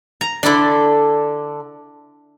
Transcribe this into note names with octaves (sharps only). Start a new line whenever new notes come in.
A#5
D3 D4 E4 A4 D5